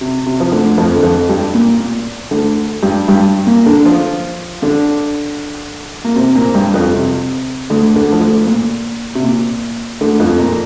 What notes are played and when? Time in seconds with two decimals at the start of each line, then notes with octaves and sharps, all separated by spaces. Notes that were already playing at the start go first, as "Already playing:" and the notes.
0.01 C3
0.26 C3
0.40 F3
0.52 D2 D3
0.78 F2 F3
0.96 D3
1.03 F2 F3
1.29 G2 G3
1.54 A#2 A#3
1.80 A#2
2.31 D2 D3
2.83 G2 G3
3.08 G2 G3
3.47 A#2 A#3
3.66 D3 D4
3.85 F3 F4
4.62 D3 D4
6.04 A#3
6.16 C3 C4
6.35 A#2 A#3
6.54 G2 G3
6.74 F2 F3
6.93 C3
7.70 D2 D3
7.96 D2 D3
8.12 F3
8.21 D2 D3
8.47 A#2
9.15 C3
9.24 A#2
10.01 D2 D3
10.20 F2 F3
10.39 A#2 A#3